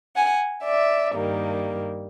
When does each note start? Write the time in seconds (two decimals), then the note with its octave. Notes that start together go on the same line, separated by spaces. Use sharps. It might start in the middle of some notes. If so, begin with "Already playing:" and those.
0.16 F#5 G#5
0.64 D5 E5
1.13 G2 D#3 G3 A#3